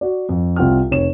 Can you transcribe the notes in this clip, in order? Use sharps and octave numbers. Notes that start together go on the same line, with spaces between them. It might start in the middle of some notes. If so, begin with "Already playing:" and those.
F#4 D5
F2
C2 C4 F4 F#5 G5 F6
F1 C4 C#5 E7